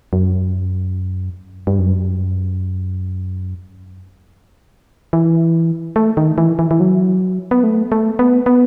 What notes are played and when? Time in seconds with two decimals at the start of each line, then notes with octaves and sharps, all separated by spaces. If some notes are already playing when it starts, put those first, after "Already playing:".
0.13 F#2
1.67 G2
1.79 F#2
5.13 E3
5.96 A3
6.17 D#3
6.38 E3
6.59 E3
6.71 E3
6.80 F#3
7.51 B3
7.64 A3
7.92 A3
8.19 B3
8.46 B3